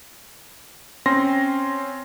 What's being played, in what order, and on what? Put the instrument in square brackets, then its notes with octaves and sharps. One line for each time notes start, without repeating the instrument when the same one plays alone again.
[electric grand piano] C4 C#4 C6 A#6